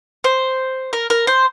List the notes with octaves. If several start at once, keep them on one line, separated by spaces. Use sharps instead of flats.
C5
A#4
A#4
C5